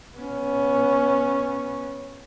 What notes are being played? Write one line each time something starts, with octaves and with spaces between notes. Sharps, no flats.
B3 C#4